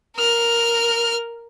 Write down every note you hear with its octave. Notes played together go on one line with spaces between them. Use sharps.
A#4 F6